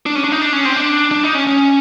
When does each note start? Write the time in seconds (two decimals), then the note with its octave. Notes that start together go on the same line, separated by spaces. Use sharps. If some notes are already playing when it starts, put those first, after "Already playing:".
0.06 D4
0.15 C#4
0.24 D4
0.32 D#4
0.42 D4
0.53 C#4
0.65 C4
0.76 D4
1.11 D4
1.24 D#4
1.35 C#4
1.47 C#4